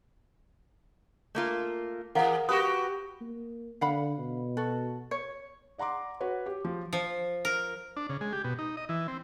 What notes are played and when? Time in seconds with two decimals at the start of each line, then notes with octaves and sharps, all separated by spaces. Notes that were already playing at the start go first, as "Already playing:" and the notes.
1.35 A3 A#3 F4
2.15 E3 G#4 A#4 F5 F#5
2.49 F#4 G4 B4 C#6 D#6
3.21 A#3
3.81 D3 F5 F#5 B5
4.18 B2
4.57 F#4 A4
5.11 C#5
5.78 D5 F#5 A#5 C6 D6
6.20 F#4 B4 C#5
6.46 G4
6.65 F3
6.93 F3
7.45 A#4
7.97 D4
8.09 C#3
8.21 G#3
8.33 G4
8.44 B2
8.59 D#4
8.77 D#5
8.89 E3
9.08 C4